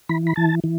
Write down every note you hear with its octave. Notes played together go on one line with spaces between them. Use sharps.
E3 B5
B5
E3 A5
E3